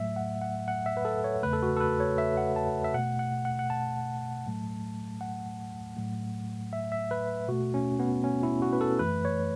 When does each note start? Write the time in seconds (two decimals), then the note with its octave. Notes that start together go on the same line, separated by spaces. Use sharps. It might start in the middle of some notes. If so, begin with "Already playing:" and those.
Already playing: A2 F#3 A3 E5
0.16 F#5
0.41 F#5
0.68 F#5
0.86 E5
0.97 B4
1.05 A4
1.24 C#5
1.43 E2 C#3 A3 B4
1.53 A4
1.62 F#4
1.77 A4
1.80 B4
2.00 C#5
2.18 E5
2.37 F#5
2.56 A5
2.84 E5
2.94 B2 A3 F#5
3.19 F#5
3.45 F#5
3.59 F#5
3.70 A5
4.46 A2 F#3 A3
5.21 F#5
5.97 A2 F#3 A3
6.73 E5
6.92 E5
7.11 B4
7.48 B2 A3 F#4
7.74 C#4
7.99 B3
8.24 C#4
8.43 E4
8.62 F#4
8.73 B4
8.81 A4
8.99 F#2 E3 A3 B4
9.25 C#5